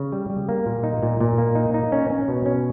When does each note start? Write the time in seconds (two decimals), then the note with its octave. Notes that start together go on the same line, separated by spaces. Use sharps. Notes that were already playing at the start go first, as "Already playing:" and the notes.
Already playing: C#3
0.12 G3
0.30 G3
0.49 A#3
0.66 A#2
0.83 D#4
1.03 A#2
1.21 A#2
1.38 A#3
1.55 D#4
1.74 D#4
1.92 C#4
2.10 C#4
2.28 B2
2.46 C#4